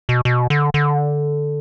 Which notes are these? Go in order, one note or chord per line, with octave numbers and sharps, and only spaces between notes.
B2
B2
D3
D3